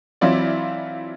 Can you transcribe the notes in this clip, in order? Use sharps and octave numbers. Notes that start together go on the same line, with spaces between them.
E3 F#3 C4 E4 F4 D5